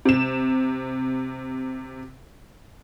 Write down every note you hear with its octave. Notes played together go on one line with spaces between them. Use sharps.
C3 E7